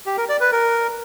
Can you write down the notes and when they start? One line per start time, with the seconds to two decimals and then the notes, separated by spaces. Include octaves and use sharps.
0.06 G4
0.18 A#4
0.29 D5
0.41 B4
0.52 A#4